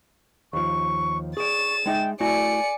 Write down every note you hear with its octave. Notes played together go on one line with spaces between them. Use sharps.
D#2 F3 C#6
G#4 D5 C#6 A6 E7
G#3 D#4 E5 G5
A3 E4 F#4 D5 G#5 C#7